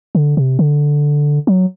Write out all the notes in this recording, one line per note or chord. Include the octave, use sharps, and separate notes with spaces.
D3
C3
D3
F#3